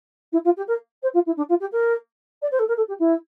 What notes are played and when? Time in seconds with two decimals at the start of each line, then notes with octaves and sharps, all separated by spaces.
0.32 E4
0.44 F4
0.57 G4
0.67 A#4
1.02 C5
1.13 F4
1.26 E4
1.37 D4
1.49 F4
1.60 G4
1.72 A#4
2.42 D5
2.51 C5
2.59 A4
2.68 A#4
2.76 A4
2.88 G4
2.99 E4